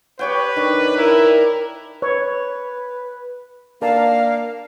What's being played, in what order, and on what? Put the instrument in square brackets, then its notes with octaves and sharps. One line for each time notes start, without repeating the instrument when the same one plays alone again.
[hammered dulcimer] G4 C#5 G5 [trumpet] B4
[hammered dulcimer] D#3 D4
[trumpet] E4 [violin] A#4
[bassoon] B4 [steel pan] C#5
[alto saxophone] A#3 [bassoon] D4 [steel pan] A#4 A5 [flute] F5